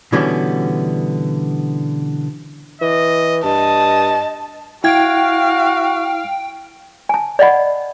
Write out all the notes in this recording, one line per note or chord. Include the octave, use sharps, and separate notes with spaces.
B2 D3 E3 G3 B3 C#4
E3 D#5
G2 D#5 A5 D#6
E4 F#4 F5 G5 G#6
G#5 A5
D5 D#5 F#5 B5